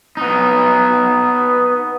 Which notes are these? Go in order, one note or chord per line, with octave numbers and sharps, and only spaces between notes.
B3 D#4